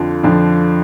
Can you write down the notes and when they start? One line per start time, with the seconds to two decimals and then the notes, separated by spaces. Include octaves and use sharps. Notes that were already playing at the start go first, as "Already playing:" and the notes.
Already playing: F2 D3 F3
0.24 F2 D3 F3